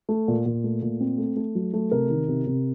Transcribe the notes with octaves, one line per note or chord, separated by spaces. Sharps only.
A3
A#2
A#2
A3
A#2
C4
A3
A3
F#3
A3
C3 A#4
D#3
C3
C3